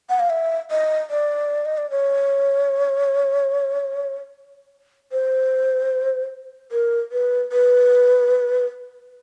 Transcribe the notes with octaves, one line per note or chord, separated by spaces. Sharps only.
F#5
F5
E5
D#5
D5
D#5
D5
C#5
C5
A#4
B4
B4